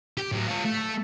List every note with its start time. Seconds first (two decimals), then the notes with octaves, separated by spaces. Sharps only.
0.18 G4
0.32 A2 F#3
0.47 F4 C#5
0.65 A3